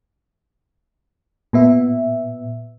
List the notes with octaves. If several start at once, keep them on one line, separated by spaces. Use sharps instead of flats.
A#2 B3 E5